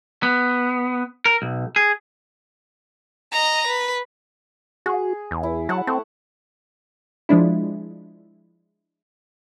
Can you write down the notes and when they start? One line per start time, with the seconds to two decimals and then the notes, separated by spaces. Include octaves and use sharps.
0.23 B3
1.26 A#4
1.42 B1
1.76 G#4
3.32 D#5 A#5
3.67 B4
4.86 F#4 G#4
5.31 E2
5.43 E4
5.69 F#3 F#5 A5
5.87 A3 C4
7.29 F3 G#3 D4 E4